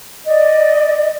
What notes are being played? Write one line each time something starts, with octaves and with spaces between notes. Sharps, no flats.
D5 D#5